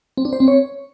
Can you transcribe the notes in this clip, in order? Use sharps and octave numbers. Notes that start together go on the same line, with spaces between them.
C4
D4
C5
C4
C#5